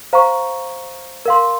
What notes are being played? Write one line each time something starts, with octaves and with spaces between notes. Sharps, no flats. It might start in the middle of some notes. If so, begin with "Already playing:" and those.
C5 F5 A#5 C#6
A#4 F5 C6